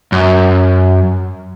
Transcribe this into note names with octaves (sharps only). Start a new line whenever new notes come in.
F#2